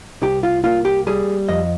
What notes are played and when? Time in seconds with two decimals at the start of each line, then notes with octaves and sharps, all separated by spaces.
0.22 C2 G4
0.43 F4
0.64 A#3 F4
0.85 G4
1.07 G3 G#4
1.49 F2 D#5